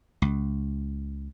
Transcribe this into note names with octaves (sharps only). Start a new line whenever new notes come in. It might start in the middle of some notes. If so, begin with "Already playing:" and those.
C#2